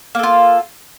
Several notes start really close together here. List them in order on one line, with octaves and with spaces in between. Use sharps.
A#3 A4 F4